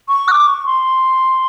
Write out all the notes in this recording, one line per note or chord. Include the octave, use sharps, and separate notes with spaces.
C#6
F#6
D6
C#6
C6